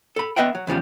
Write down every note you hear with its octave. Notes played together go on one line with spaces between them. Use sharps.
A4 B5
B3 B4 D#5 E5 F#5 G5
F#3
E2 C#3 F3 G3